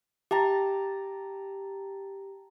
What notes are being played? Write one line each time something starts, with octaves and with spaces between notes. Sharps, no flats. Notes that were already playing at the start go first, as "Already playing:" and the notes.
G4 G5 A5 A#5